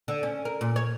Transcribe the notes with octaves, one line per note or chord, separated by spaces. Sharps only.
D3
C#4
A#4
A#2
C#5